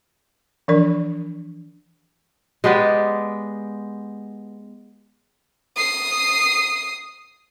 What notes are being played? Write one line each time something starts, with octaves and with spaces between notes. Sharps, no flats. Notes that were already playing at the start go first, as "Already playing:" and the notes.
E3 F3 D4 A#4 D5
G#3 B3 G4 D5
D#6 C7